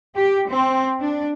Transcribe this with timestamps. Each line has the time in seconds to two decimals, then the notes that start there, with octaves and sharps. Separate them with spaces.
0.15 G4
0.48 C4
1.01 D4